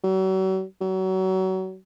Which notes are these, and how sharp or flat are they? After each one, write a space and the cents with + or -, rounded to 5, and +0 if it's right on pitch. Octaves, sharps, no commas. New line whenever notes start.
F#3 +40
F#3 +30